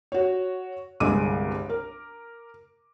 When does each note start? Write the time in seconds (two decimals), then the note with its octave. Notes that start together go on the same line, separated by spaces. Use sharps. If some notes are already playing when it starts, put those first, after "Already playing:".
0.12 F#4 C#5
1.00 G1 C2 G#3 D6 D#7
1.70 A#4